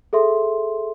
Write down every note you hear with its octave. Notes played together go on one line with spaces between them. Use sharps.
G#4 A4 E5 C6